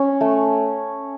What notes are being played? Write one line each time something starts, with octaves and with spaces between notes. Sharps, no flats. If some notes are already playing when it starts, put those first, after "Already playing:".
Already playing: C#4
A3